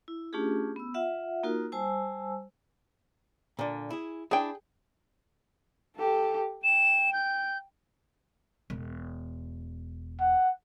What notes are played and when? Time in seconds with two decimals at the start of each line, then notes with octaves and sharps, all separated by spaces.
0.08 E4
0.33 A3 C#4 D4 F4 G4 G#4
0.76 B3 E6
0.94 F4 E5 F#5
1.43 A#3 D#4 F4 F#4 A#4
1.72 G3 C5 G#5 A5 E6
3.59 A#2 D3
3.90 E4 G#4
4.31 D4 E4 G#4 G5
5.96 G4 A4
6.64 G5 E7
7.13 G6
8.70 E1
10.20 F#5